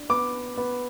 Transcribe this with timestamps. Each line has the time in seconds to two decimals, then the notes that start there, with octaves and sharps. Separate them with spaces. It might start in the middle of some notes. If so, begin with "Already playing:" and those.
Already playing: D4
0.09 B3 D6
0.57 B3